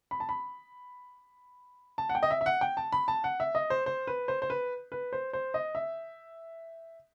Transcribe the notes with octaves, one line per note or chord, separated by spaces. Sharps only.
B5
A5
B5
A5
F#5
G5
D#5
E5
E5
F#5
G5
A5
B5
A5
F#5
E5
D#5
C5
C5
B4
C5
C5
B4
B4
C5
C5
D#5
E5